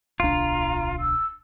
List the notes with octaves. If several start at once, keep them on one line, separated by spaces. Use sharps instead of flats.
D1 B1 D4 F4 A#5
E6